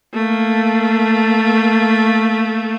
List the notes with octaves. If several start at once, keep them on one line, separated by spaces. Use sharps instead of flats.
A3 A#3